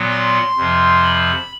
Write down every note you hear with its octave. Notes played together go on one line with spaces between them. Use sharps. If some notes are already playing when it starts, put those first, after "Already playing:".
Already playing: A#2 F#3 B3
C6
F2 C3 F3
B5